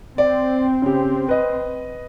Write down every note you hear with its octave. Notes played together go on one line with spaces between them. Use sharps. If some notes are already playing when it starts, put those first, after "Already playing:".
C4 D5
C#3 G4
B4 D#5